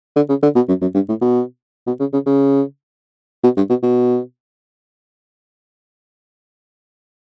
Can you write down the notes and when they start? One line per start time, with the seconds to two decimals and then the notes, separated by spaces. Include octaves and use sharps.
0.16 D3
0.29 C#3
0.43 D3
0.55 B2
0.69 F#2
0.81 F#2
0.94 G2
1.09 A2
1.21 B2
1.87 B2
2.00 C#3
2.13 C#3
2.26 C#3
3.44 B2
3.57 G2
3.70 B2
3.83 B2